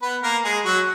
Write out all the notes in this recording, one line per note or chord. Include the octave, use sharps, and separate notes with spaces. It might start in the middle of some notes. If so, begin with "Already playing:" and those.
B3 B4
A#3 A#4
G#3 G#4
F#3 F#4